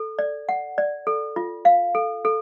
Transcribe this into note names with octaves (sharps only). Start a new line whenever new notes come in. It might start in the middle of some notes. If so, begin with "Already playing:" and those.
Already playing: A4
D5
F#5
D5
A4
F4
F5
A4
A4